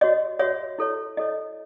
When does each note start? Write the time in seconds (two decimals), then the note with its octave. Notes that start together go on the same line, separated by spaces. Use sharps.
0.01 F#4 C#5 D#5
0.39 F#4 C#5 E5
0.78 E4 A4 C#5
1.17 E4 A4 C#5 D#5